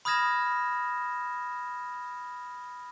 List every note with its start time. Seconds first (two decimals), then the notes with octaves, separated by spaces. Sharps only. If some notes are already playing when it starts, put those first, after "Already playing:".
0.05 B5 D#6 F6 G#6 A#6 E7